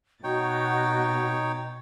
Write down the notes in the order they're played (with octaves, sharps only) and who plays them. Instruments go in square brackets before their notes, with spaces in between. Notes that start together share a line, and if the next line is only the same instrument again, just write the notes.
[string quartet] B2 A6 [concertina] D#4 C#5 G5 [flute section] F#4